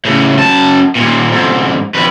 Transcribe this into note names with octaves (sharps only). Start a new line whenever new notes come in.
A2 C#3
F#2 A5
D#2 A#2
F2 G#2
F2 B4